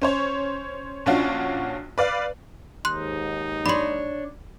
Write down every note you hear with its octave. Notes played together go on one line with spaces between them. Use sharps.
C#4 C5 C#5
A#1 C#4 D4 F4 F#4
B4 D5 F5
D#2 G#2 D#4 C6 F#6
D4 C#5 B5 C6